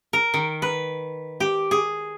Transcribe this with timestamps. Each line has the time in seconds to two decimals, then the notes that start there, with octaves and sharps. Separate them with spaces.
0.13 A#4
0.34 D#3
0.62 B4
1.40 G4
1.71 G#4